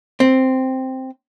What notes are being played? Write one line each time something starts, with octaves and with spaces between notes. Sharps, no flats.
C4